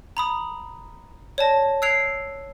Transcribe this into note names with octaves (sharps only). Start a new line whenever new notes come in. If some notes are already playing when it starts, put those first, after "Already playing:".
A#5 B5 D#6
C#5 D5 A5 A#6
E6 F#6 G#6 C7 D7 F7